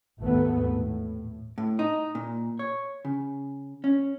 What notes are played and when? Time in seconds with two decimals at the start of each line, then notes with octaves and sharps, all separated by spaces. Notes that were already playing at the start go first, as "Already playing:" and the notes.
0.19 G#1 D#2 E3 A3 B3
0.74 A2
1.58 A2
1.79 D#4
2.15 A#2
2.59 C#5
3.05 C#3
3.84 C#4